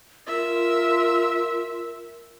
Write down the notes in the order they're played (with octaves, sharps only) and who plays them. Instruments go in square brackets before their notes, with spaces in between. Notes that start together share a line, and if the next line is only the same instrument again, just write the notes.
[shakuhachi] F4 [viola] A#4 E5